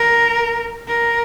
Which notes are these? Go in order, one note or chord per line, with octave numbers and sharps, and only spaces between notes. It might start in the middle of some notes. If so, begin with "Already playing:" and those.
Already playing: A#4
A#4